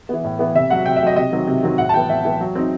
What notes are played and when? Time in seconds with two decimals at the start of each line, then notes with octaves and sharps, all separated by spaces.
0.09 E3 B3
0.24 A2
0.39 E3 B3
0.55 C3 E5
0.70 F#3 A3 F#5
0.86 C3 G5
0.96 E5
1.02 F#3 A3 D#5
1.16 C3 D#5
1.32 D#3 F#3 C4
1.47 C3
1.63 D#3 F#3 C4
1.78 A2 F#5
1.89 A5
1.94 E3 B3 G5
2.10 A2 E5
2.25 E3 B3
2.41 F#3
2.55 C4 D#4